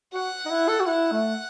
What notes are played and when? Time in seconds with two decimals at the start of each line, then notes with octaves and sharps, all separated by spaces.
0.13 F#4 F#5
0.46 D#4
0.51 E4
0.68 A4
0.80 F#4
0.87 E4 F#5
1.12 A3